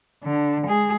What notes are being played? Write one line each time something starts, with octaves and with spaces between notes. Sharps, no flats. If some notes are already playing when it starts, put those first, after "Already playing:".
D3
G#3 G#4